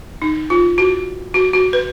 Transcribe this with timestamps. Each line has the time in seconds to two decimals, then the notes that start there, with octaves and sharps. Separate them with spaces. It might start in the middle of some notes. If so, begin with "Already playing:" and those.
0.22 D#4
0.50 F4
0.78 F#4
1.34 F#4
1.53 F#4
1.73 B4